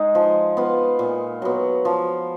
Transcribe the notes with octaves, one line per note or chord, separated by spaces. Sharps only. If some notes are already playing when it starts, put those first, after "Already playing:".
Already playing: G#3 D#4 G#4
F3
B3 F4
A#2
F#3 B3
F3